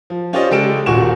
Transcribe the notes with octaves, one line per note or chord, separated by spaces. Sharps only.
F3
C#4 F4 G4 C5 D5 D#5
C#3 G#3 G4 A4 D7 E7
D#1 A#2 F#4 G#5 C#6 E7